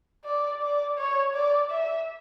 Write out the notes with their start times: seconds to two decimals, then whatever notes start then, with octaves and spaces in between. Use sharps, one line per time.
0.25 D5
0.62 D5
0.98 C#5
1.34 D5
1.70 E5